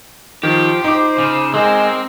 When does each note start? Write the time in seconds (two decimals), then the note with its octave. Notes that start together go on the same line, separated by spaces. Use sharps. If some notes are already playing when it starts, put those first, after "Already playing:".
0.43 D#3 F3 G4
0.84 D#4 C5 D6
1.18 C#3
1.54 G#3 C4 A#4